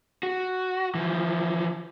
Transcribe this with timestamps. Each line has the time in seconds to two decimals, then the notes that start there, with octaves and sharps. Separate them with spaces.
0.23 F#4
0.95 E3 F3